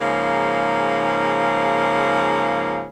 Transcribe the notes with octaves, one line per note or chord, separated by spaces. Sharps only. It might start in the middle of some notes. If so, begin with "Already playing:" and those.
G#2 C#3 F3 A#3